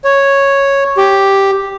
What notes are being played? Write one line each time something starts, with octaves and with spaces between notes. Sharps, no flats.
C#5
G4